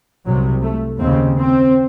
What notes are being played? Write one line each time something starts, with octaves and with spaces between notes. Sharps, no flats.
C2 C3 F#3
A3
D#2 C#3 C4
C4